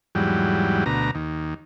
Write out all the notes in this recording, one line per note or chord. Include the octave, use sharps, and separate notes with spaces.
E2 G#2 F#3 G3
D2 B2 A#5
D#2